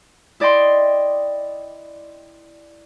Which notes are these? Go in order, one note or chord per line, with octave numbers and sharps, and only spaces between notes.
E4 D5 D#5 G5 C6